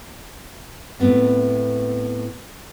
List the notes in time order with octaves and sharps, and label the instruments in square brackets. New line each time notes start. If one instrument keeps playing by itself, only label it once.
[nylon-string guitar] A2 B3 C4